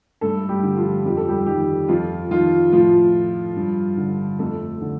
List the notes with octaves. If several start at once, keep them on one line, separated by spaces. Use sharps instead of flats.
G2 A3 A4
G3 G4
D3
F3 F4
F2 G4
A4
G3 G4
D#3 G3 G4
F2 F3 F4
D#3 F3 F4
A2 F3 F4
G2
D3
F2 A3 A4
D3